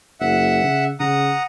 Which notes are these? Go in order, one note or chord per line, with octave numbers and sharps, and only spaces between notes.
F#1 E5 F#5
C#3
C#3 F#5 A#5 D#6